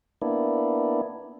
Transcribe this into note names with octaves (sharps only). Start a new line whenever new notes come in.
A#3 B3 D4 E4